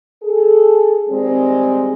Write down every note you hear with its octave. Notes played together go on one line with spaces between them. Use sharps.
G#4 A4
D#3 G3 G#3 C4